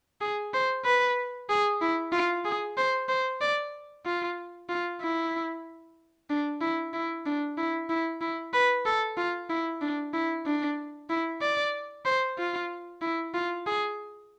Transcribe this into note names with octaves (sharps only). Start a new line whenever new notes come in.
G#4
C5
B4
G#4
E4
F4
G#4
C5
C5
D5
F4
F4
E4
D4
E4
E4
D4
E4
E4
E4
B4
A4
F4
E4
D4
E4
D4
E4
D5
C5
F4
E4
F4
G#4